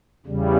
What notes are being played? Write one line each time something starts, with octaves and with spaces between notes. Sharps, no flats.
E2 C#3 G3